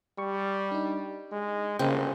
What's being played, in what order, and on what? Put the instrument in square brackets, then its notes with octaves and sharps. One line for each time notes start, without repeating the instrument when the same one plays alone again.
[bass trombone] G3 [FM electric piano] C#6
[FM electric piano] D4 D#4
[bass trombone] G#3
[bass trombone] G1 [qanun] C#3 [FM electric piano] A#3 C5 G5